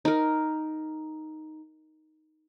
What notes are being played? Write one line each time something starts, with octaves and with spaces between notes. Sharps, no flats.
D#4 A#4